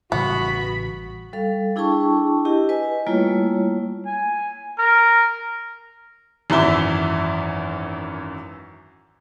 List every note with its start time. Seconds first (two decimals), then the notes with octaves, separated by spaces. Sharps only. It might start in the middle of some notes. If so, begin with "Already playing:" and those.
0.12 A1 C#3 G3 B3 F#4 B5
1.33 G3 A4 F5
1.76 D4 E4 G#4 G5 A5 C#6
2.45 E4 G4 D#5
2.69 B4 D#5 G#5
3.07 G3 A3 A#3 E4 F4 C#5
4.06 G#5
4.79 A#4
6.50 G#1 F#2 E3 E4 E5 G7